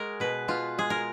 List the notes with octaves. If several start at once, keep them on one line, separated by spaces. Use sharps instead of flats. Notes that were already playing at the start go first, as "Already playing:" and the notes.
Already playing: G#3 F#4 G#4 A#4
B2 B4
B2 F4
G#3 G#4
A#4